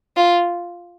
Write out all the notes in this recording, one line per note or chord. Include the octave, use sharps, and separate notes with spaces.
F4